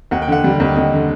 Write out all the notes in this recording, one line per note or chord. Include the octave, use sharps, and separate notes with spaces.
D#2 F#5
G5
D3 F#5
G3
D#2
D#2 D#5
D3